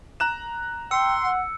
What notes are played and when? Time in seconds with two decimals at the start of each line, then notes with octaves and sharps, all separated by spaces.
0.20 A#5 F#6 E7
0.91 G5 C6 E6 C#7
1.24 F#5